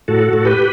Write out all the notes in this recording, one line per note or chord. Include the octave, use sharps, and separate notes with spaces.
A2 F#4 A4
A2
G4 B4